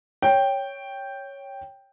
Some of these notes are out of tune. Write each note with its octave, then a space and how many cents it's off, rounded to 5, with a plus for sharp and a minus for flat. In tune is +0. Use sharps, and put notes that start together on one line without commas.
C#5 +0 G5 +0